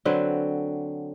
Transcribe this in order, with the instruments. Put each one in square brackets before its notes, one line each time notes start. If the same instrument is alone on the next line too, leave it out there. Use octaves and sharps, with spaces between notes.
[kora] D3 F#3 C4 B4